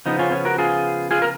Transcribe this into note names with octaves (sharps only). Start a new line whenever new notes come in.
C#3 F3 B3 D#4
C#4 F4
C#4
F#4 A#4
F4 G#4
F4 G#4
A#4